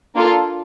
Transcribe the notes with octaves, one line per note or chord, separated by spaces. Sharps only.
A#3 D4 F4 A4